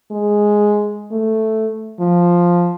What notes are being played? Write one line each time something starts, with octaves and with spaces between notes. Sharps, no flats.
G#3
A3
F3